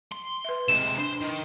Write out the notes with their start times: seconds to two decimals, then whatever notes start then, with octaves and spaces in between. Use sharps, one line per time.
0.12 C6
0.45 B4 E5
0.68 C3 G#3 E7
0.98 D4 C5
1.21 D#3